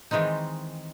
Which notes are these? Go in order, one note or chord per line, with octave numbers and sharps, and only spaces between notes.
D#3 E3 G#3 C4 D#4